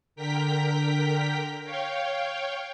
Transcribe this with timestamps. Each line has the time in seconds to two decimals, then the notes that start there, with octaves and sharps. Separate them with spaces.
0.16 D3 A#4 G5 A#5 B6
1.64 C#5 F5 G5